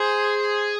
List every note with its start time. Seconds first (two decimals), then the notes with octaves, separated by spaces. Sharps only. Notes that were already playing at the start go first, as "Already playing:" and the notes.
Already playing: G#4 C5